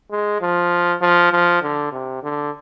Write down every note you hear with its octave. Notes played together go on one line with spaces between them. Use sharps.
G#3
F3
F3
F3
D3
C3
D3